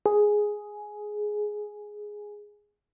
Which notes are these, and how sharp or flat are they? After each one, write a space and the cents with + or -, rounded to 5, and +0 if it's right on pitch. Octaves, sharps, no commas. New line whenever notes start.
G#4 +5